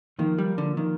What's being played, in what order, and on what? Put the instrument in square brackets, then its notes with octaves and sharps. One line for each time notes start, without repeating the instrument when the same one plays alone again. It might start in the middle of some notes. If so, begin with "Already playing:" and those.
[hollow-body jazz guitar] D#3 [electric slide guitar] F3 A#3 F4 A#4
[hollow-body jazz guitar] G3
D3
[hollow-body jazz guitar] D#3 [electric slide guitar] F3 A#3 F4 A#4